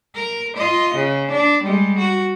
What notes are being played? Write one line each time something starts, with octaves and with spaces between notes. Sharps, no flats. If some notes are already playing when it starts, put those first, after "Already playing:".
A#4
F4 D#5
C#3
D4
G3 G#3
F#4